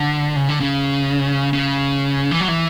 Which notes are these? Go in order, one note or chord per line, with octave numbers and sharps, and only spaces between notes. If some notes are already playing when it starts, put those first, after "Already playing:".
Already playing: D3
C#3
D3
C#3
C#3
E3
F#3
E3